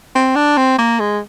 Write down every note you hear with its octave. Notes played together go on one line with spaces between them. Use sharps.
C4
D4
C4
A#3
G#3